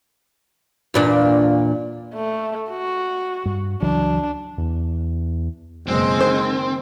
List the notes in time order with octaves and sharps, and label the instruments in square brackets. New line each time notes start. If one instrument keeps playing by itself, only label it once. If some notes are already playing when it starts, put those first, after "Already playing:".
[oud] E2 A#2 D4
[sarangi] A3
F#4
[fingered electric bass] G2
[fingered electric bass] C#2 E3 F#3 [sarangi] D4
[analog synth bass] E2
[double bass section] F#1 B2 [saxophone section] G#3 [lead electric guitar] C4
[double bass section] D#3 [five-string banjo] C5